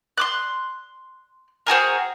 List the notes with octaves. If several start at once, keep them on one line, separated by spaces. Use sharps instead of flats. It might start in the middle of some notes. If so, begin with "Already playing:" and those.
C6 D6 F#6
C4 F#4 G#4 A#4